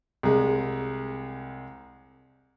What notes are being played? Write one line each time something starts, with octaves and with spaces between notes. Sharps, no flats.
C2 G#3